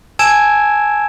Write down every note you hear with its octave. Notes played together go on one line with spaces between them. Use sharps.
G#5 A5 E6 G#6 D7 E7